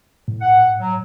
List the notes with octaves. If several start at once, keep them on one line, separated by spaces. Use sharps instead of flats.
A2
F#5
F#3